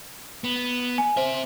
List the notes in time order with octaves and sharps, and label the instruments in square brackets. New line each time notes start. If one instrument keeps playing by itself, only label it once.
[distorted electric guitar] B3
[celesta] G#5
[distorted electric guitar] C4 E5 [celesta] C5